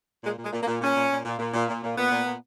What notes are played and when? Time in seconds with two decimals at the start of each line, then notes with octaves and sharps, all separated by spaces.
0.23 A#2 G#3
0.38 A#2 G#3
0.52 A#2
0.62 A#3
0.67 A#2
0.81 A#2 C#4
0.96 A#2
1.10 A#2
1.25 A#2
1.39 A#2
1.54 A#2
1.68 A#2
1.82 A#2
1.97 A#2 B3
2.11 A#2
2.26 A#2